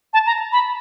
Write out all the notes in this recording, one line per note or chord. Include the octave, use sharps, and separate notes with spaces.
A5
A#5
B5